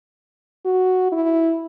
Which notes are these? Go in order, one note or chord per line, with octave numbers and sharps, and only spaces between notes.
F#4
E4